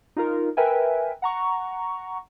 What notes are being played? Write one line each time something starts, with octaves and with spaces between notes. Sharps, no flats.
D#4 F4 A#4
A#4 B4 E5 G5 G#5
F#5 A#5 C#6